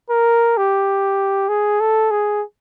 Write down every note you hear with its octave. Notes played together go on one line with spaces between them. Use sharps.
A#4
G4
G#4
A4
G#4